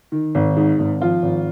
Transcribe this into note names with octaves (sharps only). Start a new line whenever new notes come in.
D#3
G#1
G#2
G#1
F3 F4
G#1